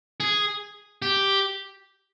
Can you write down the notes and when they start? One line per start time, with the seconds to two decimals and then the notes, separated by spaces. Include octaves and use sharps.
0.20 G#4
1.02 G4